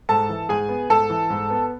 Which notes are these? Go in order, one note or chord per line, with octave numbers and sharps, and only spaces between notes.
G#2 A4 A5
E3
G#2 G#4 G#5
B3
G#2 A4 A5
E3
G#2
B3